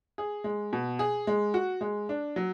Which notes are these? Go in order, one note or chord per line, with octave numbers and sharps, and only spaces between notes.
G#4
G#3
B2
G#4
G#3
F#4
G#3
D4
F#3